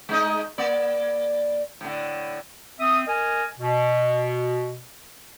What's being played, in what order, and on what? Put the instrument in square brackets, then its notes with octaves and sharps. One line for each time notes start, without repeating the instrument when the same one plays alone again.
[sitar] G#3 D#4 D#5
A#3 D5
A2 D3
[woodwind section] C4 E5 D#6
A#4 D#5 G#5
B2